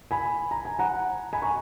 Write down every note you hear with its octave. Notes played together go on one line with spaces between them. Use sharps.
G#5 B5
A#5
G#5
F#5 A#5
G#5 B5
A#5 C#6